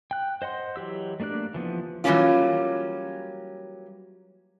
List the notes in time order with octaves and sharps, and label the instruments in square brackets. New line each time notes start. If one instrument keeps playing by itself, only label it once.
[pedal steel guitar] G5 F#6
C5 D#5 F#5 C6
E3 F#3 G4 E6
A3 A#3 D4 D5 F#6
E3 F3 B3
[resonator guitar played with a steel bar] E3 F#3 G3 A#3 C#4 F4